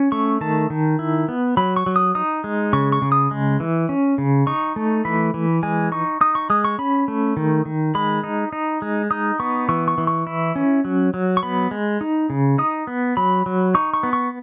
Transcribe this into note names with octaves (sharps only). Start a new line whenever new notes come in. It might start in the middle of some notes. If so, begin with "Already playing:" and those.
Already playing: C#4
A3 C#6
D#3 A5
D#3
E4
B3
F#3 B5
C#6
F#3
D#6
D#4 D#6
G#3
C#3 C#6
C#6
C#3
D#6
G#3
E3
C#4
C#3
D#4 C#6
A3
E3 B5
E3
G#3 G#5
D#4 C#6
D#4 D#6
C#6
G#3 D#6
C#6
C#4 B5
A3
D#3
D#3
G#3 B5
D#4
D#4
G#3
D#4 D#6
B3 C#6
E3 C#6
C#6
E3
C#6
E4
C#4
F#3
F#3
C#6
B3 B5
G#3
D#4
C#3
D#4 D#6
B3
F#3 B5
F#3
D#4 C#6
C#6
B3
C#6